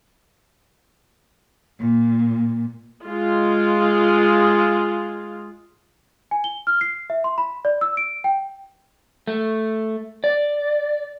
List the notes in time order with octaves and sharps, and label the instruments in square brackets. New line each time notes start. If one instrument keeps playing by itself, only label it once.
[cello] A#2
[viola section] G#3 F4
[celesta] G#5
G7
F6
C7
E5
C6
B5
D5
E6
D7
G5
[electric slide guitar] A3
D5